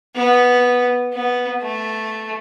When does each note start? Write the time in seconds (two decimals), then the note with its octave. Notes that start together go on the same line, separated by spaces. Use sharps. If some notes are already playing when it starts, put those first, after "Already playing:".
0.16 B3
1.13 B3
1.62 A3